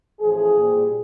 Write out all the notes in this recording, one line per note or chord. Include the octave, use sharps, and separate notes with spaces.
A1 A2 F3 G#4
C2 A#2 G3 C4